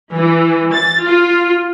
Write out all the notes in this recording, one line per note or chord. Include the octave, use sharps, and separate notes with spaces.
E3
A6
F4